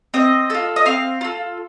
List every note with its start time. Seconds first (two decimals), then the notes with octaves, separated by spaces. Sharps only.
0.14 C4 D#5
0.50 F4 A4
0.76 D#5
0.86 C4 F5
1.21 F4 A4